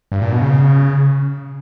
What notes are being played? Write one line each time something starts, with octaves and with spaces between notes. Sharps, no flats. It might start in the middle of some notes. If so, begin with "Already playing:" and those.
G2
A#2
B2
C#3